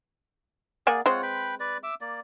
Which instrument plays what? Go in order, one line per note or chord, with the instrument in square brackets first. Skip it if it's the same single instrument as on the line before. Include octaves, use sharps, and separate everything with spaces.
[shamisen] A#3 F#5 G#5 [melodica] G#4 D5
[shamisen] G#3 C4 C5 [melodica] F4 C#5 F#5
[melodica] B4 G5 B5
B4 D5
E5 D6 E6
A#3 D5